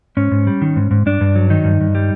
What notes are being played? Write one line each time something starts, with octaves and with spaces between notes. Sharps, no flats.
G#2 C#4
G#2
G3
D#3
G#2
G#2
G2 D4
G2
F#3
D#3 D#4
G2
G2
G3